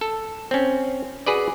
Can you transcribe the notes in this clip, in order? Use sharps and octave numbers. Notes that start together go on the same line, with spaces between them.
A4
C4 C#4
F#4 G#4 B4 D5